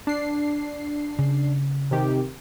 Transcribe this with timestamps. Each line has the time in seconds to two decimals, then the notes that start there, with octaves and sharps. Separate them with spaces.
0.07 D4 C7
1.19 C#3
1.91 C3 D#3 G4